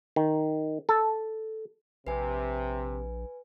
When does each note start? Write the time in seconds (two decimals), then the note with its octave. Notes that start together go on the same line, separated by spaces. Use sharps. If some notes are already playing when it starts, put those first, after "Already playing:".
0.16 D#3
0.89 A4
2.07 A#1 C3 B4 G#5